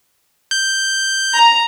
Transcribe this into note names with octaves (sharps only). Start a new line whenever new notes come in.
G6
A#5